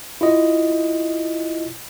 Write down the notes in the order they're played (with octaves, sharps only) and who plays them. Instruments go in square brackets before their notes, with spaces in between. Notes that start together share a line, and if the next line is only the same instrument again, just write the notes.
[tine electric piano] E4 F4 D#5